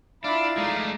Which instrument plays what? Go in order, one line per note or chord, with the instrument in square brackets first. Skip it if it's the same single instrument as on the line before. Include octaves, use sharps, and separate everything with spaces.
[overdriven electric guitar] D4 [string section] E4 F4 [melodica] D5 F5
[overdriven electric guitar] G#3 A3 [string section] D#4